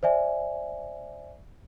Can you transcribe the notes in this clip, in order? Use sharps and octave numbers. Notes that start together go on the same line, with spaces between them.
C5 D5 E5 G#5